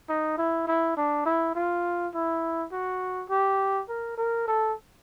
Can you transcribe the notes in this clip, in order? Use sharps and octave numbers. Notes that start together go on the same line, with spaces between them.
D#4
E4
E4
D4
E4
F4
E4
F#4
G4
A#4
A#4
A4